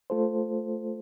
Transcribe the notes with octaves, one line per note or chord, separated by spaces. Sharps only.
A3 F4 A4 C5